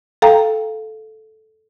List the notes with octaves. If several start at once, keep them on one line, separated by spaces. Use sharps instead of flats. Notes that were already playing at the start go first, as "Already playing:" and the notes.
A4 F5 G5 A#5